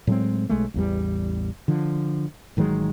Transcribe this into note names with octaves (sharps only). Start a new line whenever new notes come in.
A2 F#3 G#3 C4
B1 G#3 A3
A1 E2 G3
D3 F3
A1 D#3 F#3 G#3